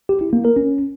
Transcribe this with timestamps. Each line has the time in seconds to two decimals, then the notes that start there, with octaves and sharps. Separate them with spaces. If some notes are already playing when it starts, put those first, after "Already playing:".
0.09 G4
0.21 E4
0.33 A#3
0.45 A#4
0.56 C#4